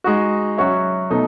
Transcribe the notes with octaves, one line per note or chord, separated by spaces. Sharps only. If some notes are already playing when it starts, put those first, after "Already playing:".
G#3 D#4 F#4
F#3 C#4 F#4 C#5 E5
B2 A3 D#4